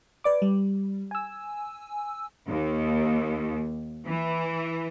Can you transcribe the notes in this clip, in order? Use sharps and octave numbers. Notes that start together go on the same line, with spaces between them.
B4 D5 D6
G3
G#5 E6
D#2
E3